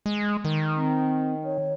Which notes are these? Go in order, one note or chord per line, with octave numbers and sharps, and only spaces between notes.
G#3
D#3
C4
C#5